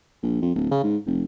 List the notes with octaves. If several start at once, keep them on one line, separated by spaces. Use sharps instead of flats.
A#1
F2
D1
C#3
G#2
F1